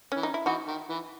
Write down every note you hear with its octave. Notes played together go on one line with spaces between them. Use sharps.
E3 C#4
D#4
E4
E3 D#4 F#4
D#3
E3